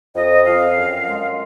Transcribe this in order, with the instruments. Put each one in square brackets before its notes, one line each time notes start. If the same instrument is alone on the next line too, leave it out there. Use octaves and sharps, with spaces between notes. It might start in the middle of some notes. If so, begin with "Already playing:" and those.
[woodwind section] F2 D#5
F2 F5
F#2
G#3